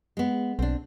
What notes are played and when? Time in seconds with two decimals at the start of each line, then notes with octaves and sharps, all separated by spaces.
0.17 G#3 B3
0.59 B1 C4 D4